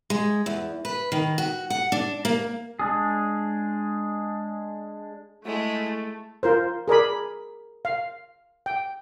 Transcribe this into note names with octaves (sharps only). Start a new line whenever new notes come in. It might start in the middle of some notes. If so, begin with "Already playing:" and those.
G#3
E2
B4
D#3
F#4
F#5
D4
A#3
G#3 D4 G#4
G#3 A3 E4
F4 A#4 C5
G#4 A#4 D5 B5
F5
G5